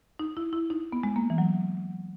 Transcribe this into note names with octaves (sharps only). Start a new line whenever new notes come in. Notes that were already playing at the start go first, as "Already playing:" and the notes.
D#4
E4
E4
D#4
B3
G#3
A#3
E3
F#3